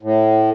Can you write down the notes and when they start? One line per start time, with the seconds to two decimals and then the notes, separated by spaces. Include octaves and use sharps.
0.03 A2